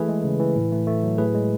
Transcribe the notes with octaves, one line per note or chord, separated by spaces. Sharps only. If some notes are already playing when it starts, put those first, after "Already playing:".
Already playing: E3 A3 G#4 B4
G#3
C#3
E3
A2
A3
A3
F#3
A2 G#4 B4
G#3